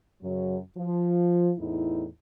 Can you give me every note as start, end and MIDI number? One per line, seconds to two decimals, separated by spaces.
0.22 0.58 42
0.22 0.58 49
0.22 0.58 54
0.77 1.52 53
1.59 2.06 40
1.59 2.06 45
1.59 2.06 63
1.59 2.06 64